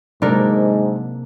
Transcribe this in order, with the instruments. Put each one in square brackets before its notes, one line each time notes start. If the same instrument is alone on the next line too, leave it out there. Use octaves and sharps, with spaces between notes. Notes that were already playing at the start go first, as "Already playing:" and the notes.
[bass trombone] G#2 [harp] C3 A#3 [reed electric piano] F#3 G#3 [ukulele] D4 A4 A#4